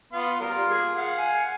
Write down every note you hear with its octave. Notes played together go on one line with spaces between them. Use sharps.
B3 F5 C6
G3 F4 A#4
A#3 G#4
F5 F#5
G#5